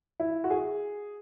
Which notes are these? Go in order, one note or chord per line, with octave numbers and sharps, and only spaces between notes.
E4
F#4
G#4